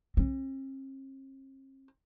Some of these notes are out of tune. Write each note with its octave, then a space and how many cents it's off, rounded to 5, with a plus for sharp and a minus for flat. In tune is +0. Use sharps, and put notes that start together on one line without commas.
C4 +45